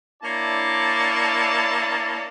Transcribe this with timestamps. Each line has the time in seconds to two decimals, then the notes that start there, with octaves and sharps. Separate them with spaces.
0.23 A#3 D4 E4 C#5 D5 A5